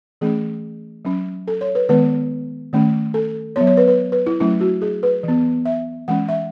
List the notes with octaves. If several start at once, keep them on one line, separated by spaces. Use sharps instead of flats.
E3 A3 C#4 G#4
F#3 C#4
A4
C#5
B4
D#3 G#3 B3 B4
D#3 A3 C#4
A4
F#3 B3 C#5
C#5
B4
B4
B4
E4
F#3 A3 C#4 E4
F#4
G#4
B4
E3 B3
E5
E3 G#3 C#4 F#5
E5